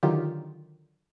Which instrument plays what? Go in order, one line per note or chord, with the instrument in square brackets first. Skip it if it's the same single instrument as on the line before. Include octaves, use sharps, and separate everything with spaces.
[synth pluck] D3 D#3 F#3 D#4 F4 G4